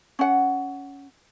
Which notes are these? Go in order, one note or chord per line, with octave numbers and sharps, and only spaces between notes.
C#4 F#5